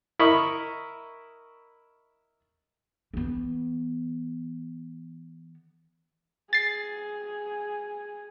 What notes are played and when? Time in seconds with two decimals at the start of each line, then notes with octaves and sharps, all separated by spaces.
0.19 E4 A#4 D#5 B5 C#6
3.14 E3 B3
6.53 G#4 A6 C7